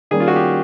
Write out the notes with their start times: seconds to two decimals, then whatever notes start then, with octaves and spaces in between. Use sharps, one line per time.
0.11 D#3 G3 A#3 C#4 G#4
0.20 F4
0.28 F#4
0.36 G4